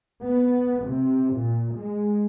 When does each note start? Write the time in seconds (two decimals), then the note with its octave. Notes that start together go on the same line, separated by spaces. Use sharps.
0.23 B3
0.86 C3
1.35 A#2
1.77 G#3